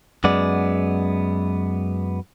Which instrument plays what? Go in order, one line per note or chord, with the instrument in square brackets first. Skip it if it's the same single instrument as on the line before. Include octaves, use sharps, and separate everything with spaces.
[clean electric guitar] F#2 G#3 B3 D5